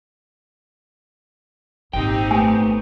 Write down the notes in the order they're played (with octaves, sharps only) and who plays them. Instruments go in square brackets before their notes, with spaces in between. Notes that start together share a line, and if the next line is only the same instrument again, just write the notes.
[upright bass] G#1 A#2 [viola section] C4 D#4 G4 [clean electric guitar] G5
[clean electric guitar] A3 B3 [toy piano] G#5